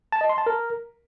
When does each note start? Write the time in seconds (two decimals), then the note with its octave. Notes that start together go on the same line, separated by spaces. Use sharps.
0.12 A5
0.21 D#5
0.29 C6
0.38 A5
0.46 A#4